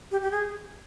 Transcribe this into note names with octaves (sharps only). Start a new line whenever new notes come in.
G4
G4
G#4